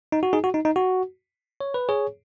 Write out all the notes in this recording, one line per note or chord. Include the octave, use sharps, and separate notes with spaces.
D#4
F#4
D#4 G#4
F#4
D#4
D#4
F#4
C#5
B4
G#4 C#5